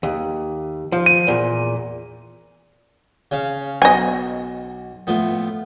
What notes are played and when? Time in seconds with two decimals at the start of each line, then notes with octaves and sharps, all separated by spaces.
0.03 D#2
0.92 F3
1.06 D#7
1.27 E2 A#2
3.31 C#3 C#4 F5
3.82 B1 D#5 G#5
5.07 A2 F3 B3